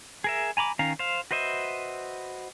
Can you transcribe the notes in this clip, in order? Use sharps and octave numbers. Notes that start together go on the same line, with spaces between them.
G#4 A#4 E5
G#5 A#5 B5 D6
D#3 C#4 F5 A#5
C5 F5
F#4 B4 C5 D#5 E5